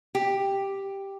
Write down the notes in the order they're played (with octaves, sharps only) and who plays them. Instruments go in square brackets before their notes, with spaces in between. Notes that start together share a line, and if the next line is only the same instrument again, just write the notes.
[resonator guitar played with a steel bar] G4